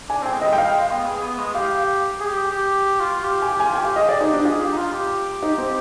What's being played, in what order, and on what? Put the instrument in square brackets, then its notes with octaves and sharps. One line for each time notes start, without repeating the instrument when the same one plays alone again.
[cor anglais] D4 [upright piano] G#5
[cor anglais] C4 [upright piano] G5
[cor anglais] G#3
[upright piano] D#5
[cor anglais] G3
[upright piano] G5
[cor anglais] G#3 [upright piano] F5
[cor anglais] G#3
G#3
B3
G#4
B3
G#3
[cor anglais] G4 [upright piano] F5
[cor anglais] G#4
G4
G4
F4
G4
[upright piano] G#5
[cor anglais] G4 [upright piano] G5
[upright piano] G#5
[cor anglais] F4
[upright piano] G5
[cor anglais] G4 [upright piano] F5
[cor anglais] G#4 [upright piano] D#5
[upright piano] D5
[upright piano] D#4 [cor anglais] G4
[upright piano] D4
[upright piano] F4 [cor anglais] G#4
[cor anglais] G4
D#4
F4
G4
[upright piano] D#4
C4